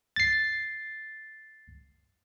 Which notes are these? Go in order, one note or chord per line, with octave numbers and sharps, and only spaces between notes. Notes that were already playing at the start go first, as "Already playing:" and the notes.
A6 C7